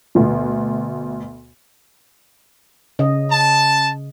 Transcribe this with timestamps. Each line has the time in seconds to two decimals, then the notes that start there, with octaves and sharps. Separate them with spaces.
0.15 D2 B2
2.99 C#3 D#5
3.31 A5